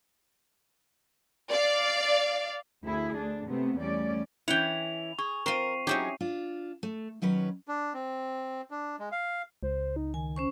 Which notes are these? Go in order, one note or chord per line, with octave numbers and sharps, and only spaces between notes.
D5 F5
D2 E4 G#4
D2 D4
C3 A3 B3 C4
E2 G3 A3 C#4 D5
E3 C#4 E4 F#5 G5 F7
G#4 C#6
C4 F4 A#4 C#6 C7 D#7
F#3 C#4 D#4 E4 G4 G#4
D4 F4
A3
D#3 F#3 C#4 B4
D4
C4
D4
G#3
F5
C#2 C5
D#4
D#3 G#5
C#4 C5 C#6